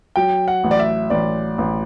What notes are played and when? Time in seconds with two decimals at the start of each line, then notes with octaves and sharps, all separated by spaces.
0.16 F#3 G5
0.48 F#5
0.64 A1
0.71 D5
0.80 E5
1.10 A1 D5
1.58 A1